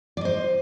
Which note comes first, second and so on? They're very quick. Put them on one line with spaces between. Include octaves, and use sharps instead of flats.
D5 D#5 C5